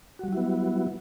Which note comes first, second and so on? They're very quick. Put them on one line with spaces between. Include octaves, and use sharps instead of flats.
F#4 G3 F#3 E4 B3